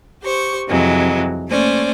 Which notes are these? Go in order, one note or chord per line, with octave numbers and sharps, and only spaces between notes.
G4 C5 C#6
F2 C3 E3 F#3 G#3
A3 A#3 C#4 C5 D5